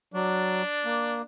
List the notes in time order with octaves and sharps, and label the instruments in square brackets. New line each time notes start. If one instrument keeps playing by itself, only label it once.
[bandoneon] F#3 [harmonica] D4
[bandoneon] A#3